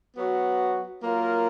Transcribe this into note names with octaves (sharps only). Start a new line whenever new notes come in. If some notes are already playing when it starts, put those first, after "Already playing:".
F#3 B3 F#4
F#3 A#3 F4 A#4